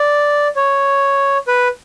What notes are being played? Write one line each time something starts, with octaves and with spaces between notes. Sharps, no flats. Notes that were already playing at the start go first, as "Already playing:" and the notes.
Already playing: D5
C#5
B4